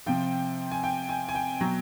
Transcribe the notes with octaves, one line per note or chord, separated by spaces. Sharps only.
C3 F3 G5
G#5
G5
G#5
G#5
G5
B2 F#3